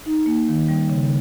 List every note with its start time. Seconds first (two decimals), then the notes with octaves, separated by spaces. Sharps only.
0.06 D#4
0.26 A#3
0.48 D#3
0.69 G3
0.90 C#3